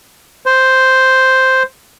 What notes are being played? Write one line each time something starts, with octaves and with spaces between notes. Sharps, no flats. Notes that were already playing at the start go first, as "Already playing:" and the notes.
C5